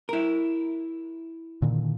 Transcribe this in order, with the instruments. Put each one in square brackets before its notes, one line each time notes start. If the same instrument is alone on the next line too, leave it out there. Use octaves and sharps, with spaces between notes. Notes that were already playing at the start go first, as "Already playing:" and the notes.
[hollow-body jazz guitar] E4 A#4
[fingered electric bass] A#2 D3 D#3